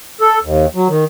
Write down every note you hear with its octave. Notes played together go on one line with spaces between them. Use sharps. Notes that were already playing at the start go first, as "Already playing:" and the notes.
A4
D#2
F#3
D#3